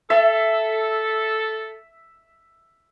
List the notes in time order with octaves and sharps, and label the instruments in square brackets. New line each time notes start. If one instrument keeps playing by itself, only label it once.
[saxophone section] A4 [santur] E5